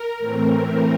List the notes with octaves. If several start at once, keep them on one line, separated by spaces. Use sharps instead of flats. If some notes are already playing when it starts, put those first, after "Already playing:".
Already playing: A#4
A2 E3 A3 C4